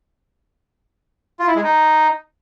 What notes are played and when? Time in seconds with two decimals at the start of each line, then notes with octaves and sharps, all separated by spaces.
1.39 F4
1.47 E4
1.56 G#3
1.64 D#4